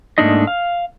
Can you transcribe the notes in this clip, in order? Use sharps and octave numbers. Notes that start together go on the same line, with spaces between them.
G#2 A3 A#3 D4 D#4 D#5
F5